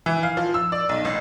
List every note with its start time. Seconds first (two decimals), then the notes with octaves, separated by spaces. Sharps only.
0.06 E3
0.23 F5
0.37 F3
0.54 E6
0.72 D5
0.89 B1
1.05 A1